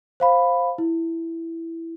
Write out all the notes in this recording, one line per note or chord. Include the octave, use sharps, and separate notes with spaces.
C5 F5 B5
E4